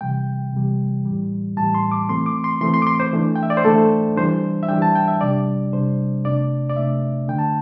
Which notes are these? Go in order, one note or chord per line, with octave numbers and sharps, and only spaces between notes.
C3 E3 G3 G5
C3 E3 G3
A2 E3 G3
A2 E3 G3 A5
C6
D6
E3 A3 C4 C6
D6
C6
E3 A3 C4 C6
C6
D6
C6
C5
E3 A3 D4
G5
E5
D5
C5
E3 A3 D4 A4
E3 G3 D4 C5
E5
E3 G3 D4 G5
A5
G5
E5
C3 G3 D4 D5
C3 G3 D4 C5
C3 A3 D4 D5
D5
C3 A3 D4 E5
D3 A3 D4 G5
A5